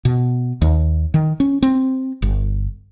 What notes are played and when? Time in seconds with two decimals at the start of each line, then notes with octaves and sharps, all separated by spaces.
0.05 B2
0.62 D#2
1.14 D#3
1.40 C#4
1.62 C4
2.22 G1